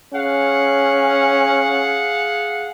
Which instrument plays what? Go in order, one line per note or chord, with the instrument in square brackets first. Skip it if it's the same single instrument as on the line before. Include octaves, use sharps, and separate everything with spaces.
[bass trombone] C#4 [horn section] G#4 F5 F#5